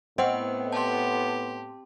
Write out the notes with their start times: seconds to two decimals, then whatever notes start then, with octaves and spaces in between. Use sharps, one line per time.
0.18 A2 B3 C4 D#5 F#5 G5
0.72 G4 A5 C6